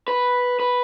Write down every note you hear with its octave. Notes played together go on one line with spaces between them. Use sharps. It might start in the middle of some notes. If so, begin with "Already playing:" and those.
B4
B4